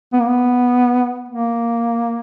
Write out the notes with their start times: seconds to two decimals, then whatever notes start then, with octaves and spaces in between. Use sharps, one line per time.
0.13 B3
0.21 A#3
0.29 B3
1.29 A#3